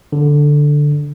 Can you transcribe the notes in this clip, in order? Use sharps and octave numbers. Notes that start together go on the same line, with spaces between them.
D3